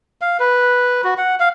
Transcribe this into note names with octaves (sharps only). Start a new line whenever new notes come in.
F5
B4
F#4
F#5
F5